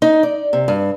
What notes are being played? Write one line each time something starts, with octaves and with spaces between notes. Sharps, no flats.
D#4
D5
C3
G2